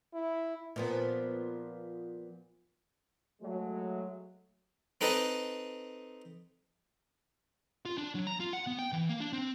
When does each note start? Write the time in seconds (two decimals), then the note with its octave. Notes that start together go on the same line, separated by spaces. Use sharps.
0.14 E4
0.76 A#2 F3 B3
3.42 F#3 G#3 A3
5.01 C4 D#4 A4 B4 D#5
7.85 F4
7.98 D4
8.15 F#3
8.27 A#5
8.40 F4
8.53 F#5
8.67 B3
8.79 G5
8.92 E3
9.09 A#3
9.20 D4
9.33 C4